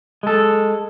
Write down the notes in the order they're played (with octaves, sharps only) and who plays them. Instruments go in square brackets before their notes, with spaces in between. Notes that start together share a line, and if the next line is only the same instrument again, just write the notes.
[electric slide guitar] G#3 A4